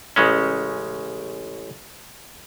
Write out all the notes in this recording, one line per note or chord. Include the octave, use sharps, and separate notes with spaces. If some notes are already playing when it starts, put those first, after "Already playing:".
A1 C#3 G#3 C#4